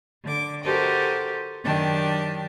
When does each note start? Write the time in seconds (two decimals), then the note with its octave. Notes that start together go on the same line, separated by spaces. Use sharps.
0.23 D3 D6
0.64 F#4 G4 A4 A#4 C5 D#5
1.64 F#2 D#3 D4 G4 A5